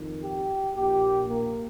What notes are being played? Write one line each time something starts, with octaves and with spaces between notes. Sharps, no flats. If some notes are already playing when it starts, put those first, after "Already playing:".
Already playing: F2 D#3
G4
A#1 A#2 G4
A#3